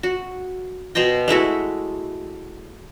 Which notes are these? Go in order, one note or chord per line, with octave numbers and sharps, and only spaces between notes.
F#4
B2 C5 D#5 G5
G#3 A3 E4 F#4